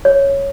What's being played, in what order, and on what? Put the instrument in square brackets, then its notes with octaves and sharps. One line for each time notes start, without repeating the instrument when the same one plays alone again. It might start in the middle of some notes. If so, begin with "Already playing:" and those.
[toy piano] C#5